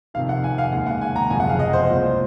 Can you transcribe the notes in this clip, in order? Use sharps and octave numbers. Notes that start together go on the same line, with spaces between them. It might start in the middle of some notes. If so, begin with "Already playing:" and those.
F2 C3 D#3 F5
F#5
G#5
F5
D#2 C#3 G#3 F#5
F#5
G#5
A#5
F#1 F2 C3 G#5
F#5
F5
D#5
C5
C2 A#2 G#3